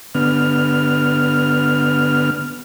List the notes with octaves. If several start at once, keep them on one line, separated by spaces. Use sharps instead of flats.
D3 B3 F6